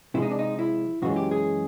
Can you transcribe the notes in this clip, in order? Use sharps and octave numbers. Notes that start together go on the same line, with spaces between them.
C3 F3 G#3 E4
D#4
D4
D#4
E4
F#2 C#3 E3 G#3 F#4
G4
G#4